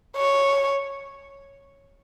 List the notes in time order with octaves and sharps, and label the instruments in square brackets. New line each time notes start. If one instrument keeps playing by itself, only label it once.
[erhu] C#5